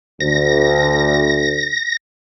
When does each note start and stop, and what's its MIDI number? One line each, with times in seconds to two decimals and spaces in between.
0.20 1.74 38
0.20 1.97 94